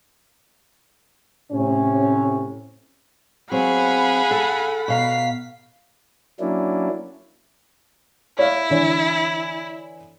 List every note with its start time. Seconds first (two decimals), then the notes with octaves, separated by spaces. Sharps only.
1.51 A2 C3 C#4
3.51 F#3 C4 G#4 F5 F#5 B5
4.31 A4
4.88 B2 F5 A#5 B6 C7
6.40 F#3 A#3 C#4 D4 E4
8.39 E4 C#5 F5
8.70 D3 E3 C#5